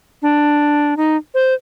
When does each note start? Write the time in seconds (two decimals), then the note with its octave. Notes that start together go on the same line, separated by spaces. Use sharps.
0.22 D4
0.97 D#4
1.34 C5